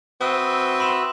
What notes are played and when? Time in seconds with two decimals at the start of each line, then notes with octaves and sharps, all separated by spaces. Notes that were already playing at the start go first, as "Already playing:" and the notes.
0.21 C4 F#4 B4 E5 D#6 E6
0.80 B5 C6 E7